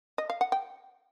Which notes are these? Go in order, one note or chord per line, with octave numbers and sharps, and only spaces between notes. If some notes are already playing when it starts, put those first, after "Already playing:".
D#5
F5
F#5
G5